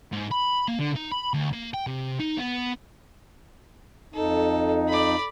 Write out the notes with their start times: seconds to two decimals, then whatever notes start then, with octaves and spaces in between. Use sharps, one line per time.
0.12 G#2
0.31 B5
0.68 A#3
0.79 D3
0.96 D#4
1.12 B5
1.34 D2
1.53 A#3
1.74 G5
1.87 C3
2.20 D#4
2.37 B3
4.14 F2 D#4 A4
4.88 D5 B5